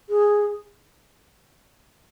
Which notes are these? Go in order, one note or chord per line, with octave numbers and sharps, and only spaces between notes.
G#4